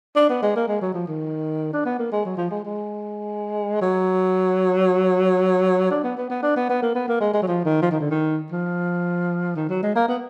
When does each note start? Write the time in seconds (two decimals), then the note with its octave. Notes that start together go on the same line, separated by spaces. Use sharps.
0.16 D4
0.29 B3
0.42 G#3
0.56 A#3
0.68 G#3
0.81 F#3
0.94 F3
1.07 D#3
1.73 D4
1.85 B3
1.99 A#3
2.12 G#3
2.25 F#3
2.37 F3
2.51 G#3
2.65 G#3
3.81 F#3
5.91 D4
6.04 B3
6.17 B3
6.30 B3
6.43 D4
6.56 B3
6.69 B3
6.82 A#3
6.95 B3
7.08 A#3
7.21 G#3
7.34 G#3
7.42 F#3
7.47 F3
7.65 D#3
7.82 F3
7.91 D#3
8.00 D3
8.11 D#3
8.52 F3
9.56 D#3
9.69 F#3
9.83 G#3
9.96 A#3
10.08 B3